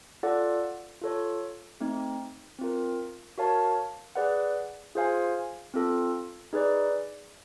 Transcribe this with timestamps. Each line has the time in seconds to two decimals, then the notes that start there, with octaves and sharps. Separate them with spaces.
0.23 F4 A4 D5 F#5
1.02 F4 A4 C#5
1.80 A3 C4 D#4
2.59 C4 F4 A#4
3.38 F#4 A#4 C#5 F5 A5
4.15 G#4 B4 D5 F#5
4.95 F4 G#4 C5 F5 G#5
5.74 C4 F4 A4
6.53 D#4 G#4 B4 D5